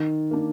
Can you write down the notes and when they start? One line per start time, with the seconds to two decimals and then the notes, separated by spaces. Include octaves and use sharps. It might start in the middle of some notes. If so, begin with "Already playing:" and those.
Already playing: D#3
0.31 A#3 D4